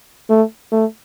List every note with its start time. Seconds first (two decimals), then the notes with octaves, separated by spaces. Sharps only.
0.29 A3
0.72 A3